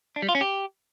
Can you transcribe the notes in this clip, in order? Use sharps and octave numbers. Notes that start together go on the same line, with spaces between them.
D4
G3
F4
C#4
G4